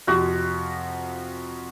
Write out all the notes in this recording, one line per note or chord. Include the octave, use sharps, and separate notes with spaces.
F2 C3 F3 F#4